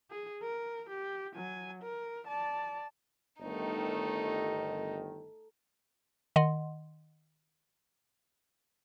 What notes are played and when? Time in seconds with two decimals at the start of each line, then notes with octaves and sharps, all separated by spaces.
0.11 G#4
0.42 A#4
0.90 G4
1.36 F#3 G#5
1.82 A#4
2.27 D5 A5
3.41 G1 D#3 A3 D#4
6.36 D#3 D#5 F#5 C6